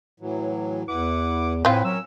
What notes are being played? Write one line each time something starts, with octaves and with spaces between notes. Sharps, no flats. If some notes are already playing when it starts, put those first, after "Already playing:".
A2 E3 F#3
E2 E4 B4 F#5 D6
A2 C4 F4 B4 C5 G#5
F#3 C#4 A#4 C#5 E6